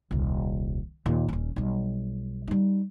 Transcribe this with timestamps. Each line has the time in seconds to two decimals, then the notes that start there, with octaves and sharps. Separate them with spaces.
0.11 D#1 C2
1.06 D#2 A#2
1.28 D#1 C#4
1.56 B1 G3
2.48 G3 D#4